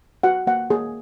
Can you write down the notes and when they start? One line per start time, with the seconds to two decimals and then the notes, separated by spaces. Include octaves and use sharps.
0.23 F#4 F#5
0.47 A#3 F#5
0.70 A#3 G#4